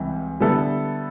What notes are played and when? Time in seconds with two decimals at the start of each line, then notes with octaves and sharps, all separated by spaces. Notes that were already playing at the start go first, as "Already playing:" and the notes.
Already playing: C#2 C3 E3 G3
0.40 D3 G3 B3 E4 A4